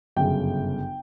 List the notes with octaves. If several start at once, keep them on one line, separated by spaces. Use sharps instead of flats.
G1 F#2 C#3 G5